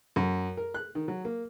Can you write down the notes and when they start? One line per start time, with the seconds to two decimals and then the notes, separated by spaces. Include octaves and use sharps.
0.16 F#2
0.57 A#4
0.75 F#6
0.95 D#3
1.08 F#3
1.25 A#3